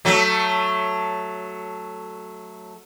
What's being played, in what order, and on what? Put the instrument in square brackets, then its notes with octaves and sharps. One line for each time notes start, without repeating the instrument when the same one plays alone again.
[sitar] F#3 A3